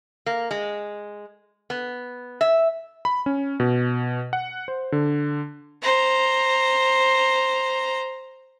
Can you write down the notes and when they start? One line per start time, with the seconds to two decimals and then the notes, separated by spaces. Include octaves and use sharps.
0.26 A#3
0.51 G#3
1.70 B3
2.41 E5
3.05 B5
3.26 C#4
3.60 B2
4.33 F#5
4.68 C5
4.92 D3
5.82 C5 A#5